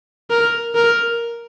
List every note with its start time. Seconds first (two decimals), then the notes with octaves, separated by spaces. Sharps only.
0.30 A#4
0.75 A#4